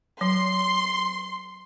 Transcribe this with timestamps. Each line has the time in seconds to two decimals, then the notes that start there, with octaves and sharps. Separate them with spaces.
0.21 F#3 C6